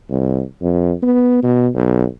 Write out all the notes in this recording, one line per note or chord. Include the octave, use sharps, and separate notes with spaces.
C2
F2
B3
B2
B1